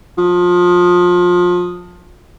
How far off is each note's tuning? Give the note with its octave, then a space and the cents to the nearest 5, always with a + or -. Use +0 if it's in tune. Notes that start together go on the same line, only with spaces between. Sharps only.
F3 +25